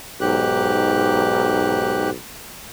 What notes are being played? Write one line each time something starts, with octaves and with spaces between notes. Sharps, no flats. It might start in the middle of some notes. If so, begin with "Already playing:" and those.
B1 G#2 G4 F#6